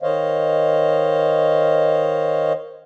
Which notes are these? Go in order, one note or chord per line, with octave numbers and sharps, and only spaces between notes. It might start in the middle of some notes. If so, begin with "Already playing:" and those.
D#3 C5 C#5 D#5 F5